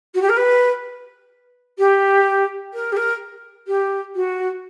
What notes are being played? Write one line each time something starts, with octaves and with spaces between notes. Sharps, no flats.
F#4
G4
A#4
B4
G4
A#4
G4
A#4
G4
F#4